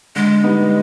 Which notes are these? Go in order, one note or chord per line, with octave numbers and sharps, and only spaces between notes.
D3 G#3
G3 B3 D#4